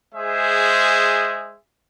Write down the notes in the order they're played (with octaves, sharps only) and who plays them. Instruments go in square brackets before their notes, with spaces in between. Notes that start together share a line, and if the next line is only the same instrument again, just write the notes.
[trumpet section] G#3 G#4 C5 E5